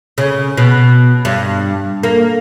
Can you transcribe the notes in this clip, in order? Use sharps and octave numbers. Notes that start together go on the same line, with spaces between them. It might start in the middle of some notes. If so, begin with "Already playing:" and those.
C#3
B2
G2
A#3